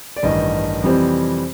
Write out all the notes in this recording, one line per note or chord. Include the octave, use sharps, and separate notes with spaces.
D5
A1 G2 D#3 D#5
F2 C3 E3 G3 C4